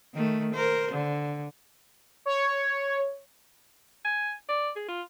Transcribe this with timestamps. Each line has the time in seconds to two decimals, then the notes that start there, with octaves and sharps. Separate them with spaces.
0.14 D#3 A3
0.54 A#4 C5
0.92 D3
2.26 C#5
4.05 G#5
4.49 D5
4.76 G#4
4.88 F4